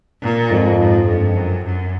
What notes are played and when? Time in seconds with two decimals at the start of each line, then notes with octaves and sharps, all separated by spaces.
0.22 A#2
0.50 F2 G#2
0.79 G#2
1.07 G2
1.36 F#2
1.65 F#2